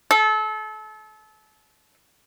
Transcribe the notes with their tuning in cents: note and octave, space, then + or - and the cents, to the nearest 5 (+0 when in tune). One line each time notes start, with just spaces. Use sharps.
A4 -30